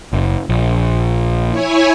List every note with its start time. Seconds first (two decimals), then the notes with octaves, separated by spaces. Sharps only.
0.13 F#1
0.49 A#1
1.49 E4 C#5 G#5